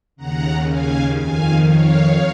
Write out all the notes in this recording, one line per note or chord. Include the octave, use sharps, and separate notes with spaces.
D#2 C#3 F#5 A#5
F5 G#5
F2 D#3 F5 G#5
C#5 F5